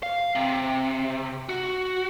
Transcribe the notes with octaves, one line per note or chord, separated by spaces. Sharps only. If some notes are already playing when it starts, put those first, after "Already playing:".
F5
C3
F#4